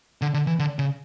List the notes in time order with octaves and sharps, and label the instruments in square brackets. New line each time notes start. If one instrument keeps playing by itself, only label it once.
[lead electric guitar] D3
D3
E3
D3
C#3